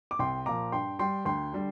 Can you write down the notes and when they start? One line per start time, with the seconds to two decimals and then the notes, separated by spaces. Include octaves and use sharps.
0.11 D6
0.19 C2 G5 C6
0.46 A#2 F3 A#5 D6
0.72 G2 G5 C6
0.99 G3 G5 C6
1.25 D2 G5 C6
1.53 D3 G3